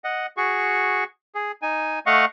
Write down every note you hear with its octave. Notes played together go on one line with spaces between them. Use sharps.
D#5 F#5
F#4 G#4 C#6
G#4
D#4 G#5
A3 D#5 F5 F#5 C#6